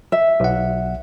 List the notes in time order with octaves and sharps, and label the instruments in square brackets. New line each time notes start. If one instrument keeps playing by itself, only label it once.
[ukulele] E5
[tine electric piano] B1 F#5